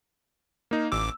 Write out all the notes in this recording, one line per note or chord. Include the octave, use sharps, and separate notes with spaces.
A#3 D#4
A1 D6 E6